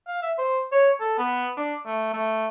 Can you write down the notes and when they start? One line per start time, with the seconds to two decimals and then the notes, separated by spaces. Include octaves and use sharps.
0.08 F5
0.22 E5
0.38 C5
0.72 C#5
1.00 A4
1.18 B3
1.57 D4
1.86 A3
2.13 A3